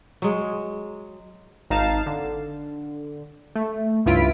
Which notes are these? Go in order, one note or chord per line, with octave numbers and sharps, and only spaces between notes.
F#3 G#3
G#1 D#4 F5 A5
D3
A3
C#2 G2 E4 F4 B6 D7